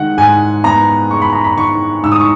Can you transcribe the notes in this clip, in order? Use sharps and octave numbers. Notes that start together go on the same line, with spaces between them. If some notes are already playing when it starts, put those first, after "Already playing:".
Already playing: D#3 G#3 F#5
G#2 G#5
B3 A#5
G#3 C#6
B5
A#5
B5
D#3 C#6
G#2 E6
D#6
C#6